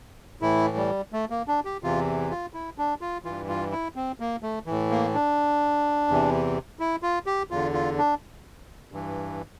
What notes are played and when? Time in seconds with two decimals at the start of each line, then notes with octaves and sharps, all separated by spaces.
0.41 A2 E3 E4
0.77 G3
1.13 A3
1.30 A#3
1.48 D4
1.65 G4
1.83 E2 C3 E3 F4
2.30 F4
2.53 E4
2.78 D4
3.01 F4
3.25 G2 E3 F4
3.48 F4
3.72 E4
3.96 C4
4.20 A#3
4.43 A3
4.66 A2 E3
4.90 A#3
5.14 D4
6.08 E2 C3 E3
6.80 E4
7.03 F4
7.26 G4
7.50 E2 D3 F4
7.73 F4
7.98 D4
8.92 G2 E3